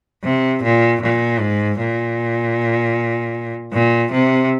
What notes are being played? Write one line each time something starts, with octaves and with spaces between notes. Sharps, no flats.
C3
A#2
A#2
G#2
A#2
A#2
C3